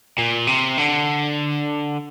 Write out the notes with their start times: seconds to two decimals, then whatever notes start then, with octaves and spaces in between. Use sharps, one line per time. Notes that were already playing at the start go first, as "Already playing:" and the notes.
0.18 A#2
0.47 C3
0.78 D3